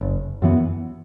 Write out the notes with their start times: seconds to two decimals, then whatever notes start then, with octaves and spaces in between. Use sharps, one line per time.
0.01 F#1
0.42 F#2 E3 B3